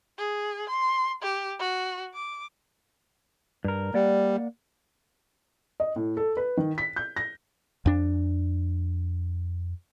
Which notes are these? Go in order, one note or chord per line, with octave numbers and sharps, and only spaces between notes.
G#4
C6
G4
F#4
D6
G2 A#4
G3 A#3 D5 F#5
D#5
A2
A4
B4
D#3
B6
G6
A#6
F2 D4